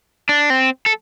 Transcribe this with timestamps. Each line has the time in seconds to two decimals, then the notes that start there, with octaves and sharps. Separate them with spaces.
0.29 D4
0.50 C4
0.86 A4